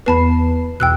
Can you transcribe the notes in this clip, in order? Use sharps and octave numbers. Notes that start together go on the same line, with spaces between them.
E2 B3 B4 A5 B5 C7
B1 E2 B2 G5 E6 F#6